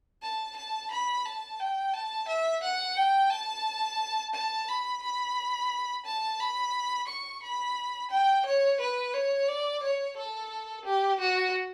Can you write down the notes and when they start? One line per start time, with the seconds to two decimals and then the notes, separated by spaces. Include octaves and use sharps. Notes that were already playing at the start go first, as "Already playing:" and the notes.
0.22 A5
0.56 A5
0.91 B5
1.25 A5
1.60 G5
1.94 A5
2.28 E5
2.63 F#5
2.97 G5
3.31 A5
4.34 A5
4.68 B5
5.02 B5
6.06 A5
6.40 B5
7.08 C#6
7.43 B5
8.11 G5
8.45 C#5
8.80 B4
9.14 C#5
9.49 D5
9.83 C#5
10.17 A4
10.85 G4
11.20 F#4